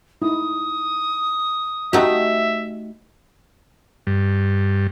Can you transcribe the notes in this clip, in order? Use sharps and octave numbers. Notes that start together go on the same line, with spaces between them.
D#4 E4 D#6
A3 D#4 F#4 G4 E5 F#5
G2